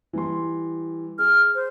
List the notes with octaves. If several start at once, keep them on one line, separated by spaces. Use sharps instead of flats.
E3 G3 C6
G#4 F6
C5